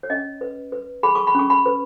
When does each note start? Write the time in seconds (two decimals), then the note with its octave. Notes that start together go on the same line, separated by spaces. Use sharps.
0.03 C#5
0.10 C#4 D#5
0.41 B4
0.72 B4
1.03 G#4 B5
1.15 C#6
1.27 B5
1.35 C#4 C#6
1.50 B5
1.66 B4